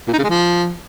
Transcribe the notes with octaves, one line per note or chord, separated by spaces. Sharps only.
A#2
D#4
C#3
G#3
F3